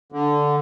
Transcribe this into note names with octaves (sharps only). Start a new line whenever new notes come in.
D3